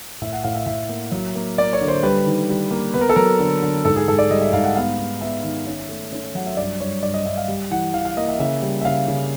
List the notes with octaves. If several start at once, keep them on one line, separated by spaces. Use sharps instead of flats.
A2 E5
F#5
A2 F5
E5
A2 E5
A#3
F#3
A#3
A#3 D5
C#5
D3
C5
G3 B4
D#3
G3
A#3
B3 B4
A#4
A4
F#3 A#4
D3
D3
G#2 A4
G#4
G#2 A4
D5
G3 D#5
E5
G#2 F5
F#5
B3 F5
B3
B3 E5
D#3
C#4
A3
C#4
F#3 F#5
E5
G2 D5
G2 C#5
G2 D5
D#5
G2 E5
F5
G3
E3 F#5
E3 F5
F5
A#3 D#5
E5
C#3 E5
G3
E5
C#3 F5
C#3